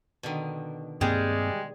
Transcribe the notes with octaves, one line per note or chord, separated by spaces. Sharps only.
B2 D3 D#3
G2 G3 G#3 A#3 C4 G#4